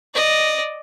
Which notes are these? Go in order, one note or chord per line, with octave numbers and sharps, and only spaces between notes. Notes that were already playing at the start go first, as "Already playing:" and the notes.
D5 D#5